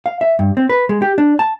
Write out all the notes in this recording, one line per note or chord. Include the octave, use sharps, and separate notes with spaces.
F5
E5
G2
C4
B4
G#3
G4
D4
A5